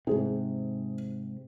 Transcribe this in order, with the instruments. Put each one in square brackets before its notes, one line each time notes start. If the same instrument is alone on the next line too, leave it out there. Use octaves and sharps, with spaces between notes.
[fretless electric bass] G#2 C3 [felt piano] G#4